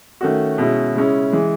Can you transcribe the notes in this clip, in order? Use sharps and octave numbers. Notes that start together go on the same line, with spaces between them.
D#3 A3 C#4 F#4
B2 G#3 C#4 E4
C#3 G#3 C#4 E4
E3 G#3